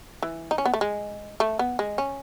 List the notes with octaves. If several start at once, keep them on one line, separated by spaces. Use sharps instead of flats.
E3
D#4
C#4
B3
A3
G#3
A3
B3
G#3
C#4